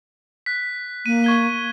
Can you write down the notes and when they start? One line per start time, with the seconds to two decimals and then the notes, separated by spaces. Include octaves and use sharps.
0.46 F#6 B6
1.06 A#3 D#7
1.24 C#6 G#6 G7